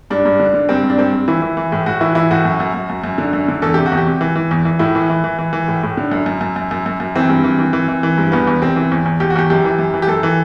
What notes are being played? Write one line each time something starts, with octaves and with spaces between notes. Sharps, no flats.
G2 D4
G2
D3
D3
G2 C4
G2
D4
G2 C4
G2
E3 E4
E3
E3
A2
A2 F#4
E3 E4
E3 E4
A2 F#4
F#2
F#2
F#2
F#2
F#2
D3
F#2
D3
E2 A4
C3 G4
F#4
E2
G4
C3
E3
E3
E2
E3
A2 E4
E3
E3
E3
E3
E3
A2
A2
D3
F#2
F#2
F#2
F#2
F#2
F#2
F#2
E3 C4
G2
E3
E3
E3
E3
E3
G2
E2 B3
E2
C3 C4
E3
E2
E2
E2 G4
F#4
E2 G4
F#2 G4
E3
F#2
E3
G4
F#2 A4
E3